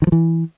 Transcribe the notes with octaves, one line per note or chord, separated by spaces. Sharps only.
D#3
F3
E3